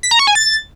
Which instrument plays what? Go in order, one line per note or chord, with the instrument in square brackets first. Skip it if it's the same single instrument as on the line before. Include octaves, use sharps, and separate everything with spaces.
[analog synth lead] B6
A#5
C#6
G#5
A6